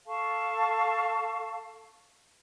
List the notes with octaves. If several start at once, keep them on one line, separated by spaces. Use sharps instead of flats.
A4 F5 A5 C#6